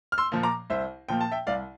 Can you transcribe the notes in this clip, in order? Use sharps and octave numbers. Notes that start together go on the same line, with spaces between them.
F6
C6 E6
A#2 F3 A#3
A#5 D6
C2 C5 E5
A#2 F3 A#3 G5
A5
E5 G5
C2 D5 F5